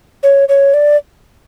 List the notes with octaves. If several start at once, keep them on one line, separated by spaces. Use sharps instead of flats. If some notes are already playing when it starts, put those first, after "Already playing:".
C#5
C#5
D5